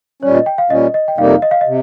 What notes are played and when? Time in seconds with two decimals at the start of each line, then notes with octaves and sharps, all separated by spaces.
0.22 A#2 G3 C#4 C#5
0.35 D#5
0.46 G5
0.58 F5
0.70 A#2 G3 C#4 D#5
0.94 D#5
1.08 G5
1.18 F2 C3 G3 A#3 D#4 F5
1.42 D#5
1.51 F5
1.61 D#5
1.67 C3